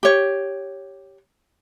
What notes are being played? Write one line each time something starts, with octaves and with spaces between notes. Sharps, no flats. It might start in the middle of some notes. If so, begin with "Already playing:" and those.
G4 C#5